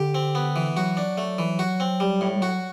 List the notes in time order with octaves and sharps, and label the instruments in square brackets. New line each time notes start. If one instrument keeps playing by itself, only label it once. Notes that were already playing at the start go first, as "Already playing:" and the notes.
Already playing: [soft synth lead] D3 [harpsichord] G4
[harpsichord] C4
B3
E3
[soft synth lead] F#3 [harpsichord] F#4
[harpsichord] D4
A3
E3
F#4
C4
G3
A2
[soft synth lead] G3
[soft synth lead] F#3 [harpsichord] F#4